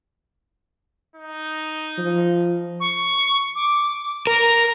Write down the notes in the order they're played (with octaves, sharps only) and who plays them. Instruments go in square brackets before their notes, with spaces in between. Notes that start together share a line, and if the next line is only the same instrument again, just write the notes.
[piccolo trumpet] D#4
[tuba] F3
[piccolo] C#6
D6
[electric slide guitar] A#4 [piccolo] A#5